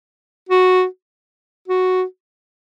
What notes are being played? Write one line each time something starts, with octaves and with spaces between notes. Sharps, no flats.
F#4
F#4